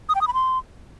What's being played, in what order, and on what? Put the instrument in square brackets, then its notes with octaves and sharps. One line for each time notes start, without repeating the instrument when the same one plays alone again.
[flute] D#6
G5
D#6
B5
C6